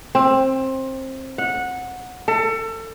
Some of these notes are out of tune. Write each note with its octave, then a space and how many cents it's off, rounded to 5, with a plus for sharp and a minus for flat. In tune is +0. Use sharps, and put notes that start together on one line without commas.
C4 +20
F#5 -15
A4 +30